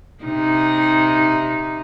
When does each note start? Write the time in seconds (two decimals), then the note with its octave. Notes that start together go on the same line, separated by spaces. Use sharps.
0.24 C3 D#4